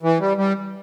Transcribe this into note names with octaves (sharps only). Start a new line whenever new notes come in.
E3
G3
G3